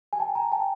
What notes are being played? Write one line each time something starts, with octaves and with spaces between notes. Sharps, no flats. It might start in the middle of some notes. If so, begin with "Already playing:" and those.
G#5
G5 A5
G#5 A#5
G5 A5